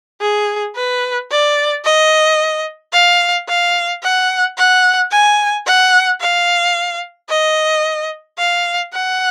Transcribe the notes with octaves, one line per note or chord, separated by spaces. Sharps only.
G#4
B4
D5
D#5
F5
F5
F#5
F#5
G#5
F#5
F5
D#5
F5
F#5